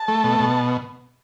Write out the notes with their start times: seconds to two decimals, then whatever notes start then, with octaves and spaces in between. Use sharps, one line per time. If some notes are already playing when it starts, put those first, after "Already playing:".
Already playing: A5
0.08 A3
0.24 B2
0.40 B2